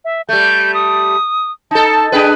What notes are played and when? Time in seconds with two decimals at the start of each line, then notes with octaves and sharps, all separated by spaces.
0.05 E5
0.29 G3 A3 G6
0.74 D#6
1.71 D#4 A4 A5
2.12 D4 G#4 B4 G5